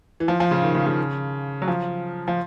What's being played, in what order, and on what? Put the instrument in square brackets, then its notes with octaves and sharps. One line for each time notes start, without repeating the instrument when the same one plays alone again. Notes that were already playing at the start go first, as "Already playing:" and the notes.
[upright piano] E3
F3
F3
C#3
D#3
C#3
C#3
F#3
F3
F3